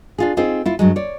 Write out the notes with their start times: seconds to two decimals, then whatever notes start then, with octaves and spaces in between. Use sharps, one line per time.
0.18 D4 F4 G#4
0.37 C4 D#4 F4 G#4 C5
0.66 E4 F4
0.79 G2 F#3 G#3
0.96 C#5 D5